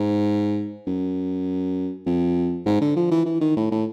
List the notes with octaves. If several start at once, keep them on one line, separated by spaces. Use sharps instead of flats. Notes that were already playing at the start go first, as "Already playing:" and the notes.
Already playing: G#2
F#2
F2
G#2
D3
F3
E3
E3
D#3
A2
A2